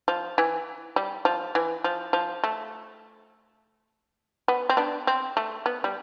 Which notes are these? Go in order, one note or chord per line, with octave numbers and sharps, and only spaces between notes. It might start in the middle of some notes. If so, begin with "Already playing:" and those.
F3
E3
G3
F3
E3
F3
F3
A3
B3
C4
B3 D4
C4
A3
B3
G3